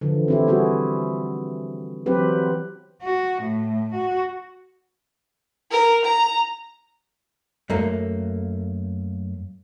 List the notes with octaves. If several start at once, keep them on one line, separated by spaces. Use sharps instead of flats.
D3 E3 F3
C4 E4 G4
G3 B3 E4 F#4 G#4
E3 F#3 C4 G4 B4
F#4
A2
F#4
A#4
A#5
F#2 A3 A#3